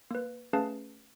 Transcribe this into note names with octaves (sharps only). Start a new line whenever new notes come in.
A#3 B4
A3 C#4 G#4 B4 F5 A5